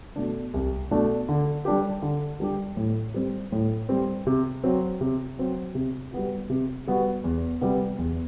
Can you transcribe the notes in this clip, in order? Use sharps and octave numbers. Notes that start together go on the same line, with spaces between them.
B2 A3 D4
C2
B2 A3 D4
D3
G3 D4 G4
D3
G3 D4 G4
A2
G3 C4
A2
G3 C4
C3
F#3 C4
C3
F#3 C4
C3
G3 B3 F#4
C3
G3 B3 F#4
E2
C3 G3 B3
E2